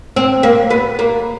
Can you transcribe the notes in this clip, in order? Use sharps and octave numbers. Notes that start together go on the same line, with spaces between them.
C4
A#3
B3
A#3